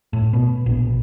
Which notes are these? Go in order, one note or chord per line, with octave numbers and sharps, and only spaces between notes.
A2
B2
A#1